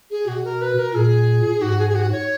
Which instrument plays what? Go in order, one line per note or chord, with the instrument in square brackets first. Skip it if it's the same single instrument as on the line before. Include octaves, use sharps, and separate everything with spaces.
[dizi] G#4
[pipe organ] B2 [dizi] F#4
[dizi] A#4
B4
A#4
[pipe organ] A#2 [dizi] G#4
[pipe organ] G#2 [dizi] F#4
[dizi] G#4
G#4
F#4
C#5